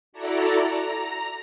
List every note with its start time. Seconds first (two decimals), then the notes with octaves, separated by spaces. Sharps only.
0.13 E4 F#4 A4 D5 A#5
0.69 A#5